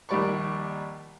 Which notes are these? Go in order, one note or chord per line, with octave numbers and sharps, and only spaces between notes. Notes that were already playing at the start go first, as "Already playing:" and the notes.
A#1 D#2 G3 D5 B5 C#6